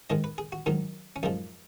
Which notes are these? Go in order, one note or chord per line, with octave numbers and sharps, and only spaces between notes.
G#2 D#3 G#3 D#5
B4
G#4
F#4
G#2 D#3 F#3 D#4
C#4
F#2 F3 G#3 D#4